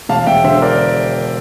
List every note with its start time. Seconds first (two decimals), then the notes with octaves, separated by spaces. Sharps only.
0.09 E1 F5 A5
0.27 E1 E5 G5
0.44 D3 C5 E5
0.62 A#4 D5